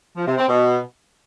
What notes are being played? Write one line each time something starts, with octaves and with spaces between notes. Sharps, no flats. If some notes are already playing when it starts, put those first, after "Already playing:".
F3
C3
C4
B2